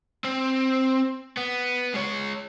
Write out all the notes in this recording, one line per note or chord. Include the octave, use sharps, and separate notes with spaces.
C4
B3
G#3 C#5